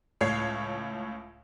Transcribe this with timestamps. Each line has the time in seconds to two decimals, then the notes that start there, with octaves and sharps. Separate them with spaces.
0.21 C#2 A2 C#5 G#6 C7